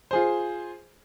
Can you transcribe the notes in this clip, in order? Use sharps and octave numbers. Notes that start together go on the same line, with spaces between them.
F4 G#4 C5